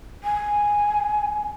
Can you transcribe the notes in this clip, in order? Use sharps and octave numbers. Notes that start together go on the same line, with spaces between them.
G#5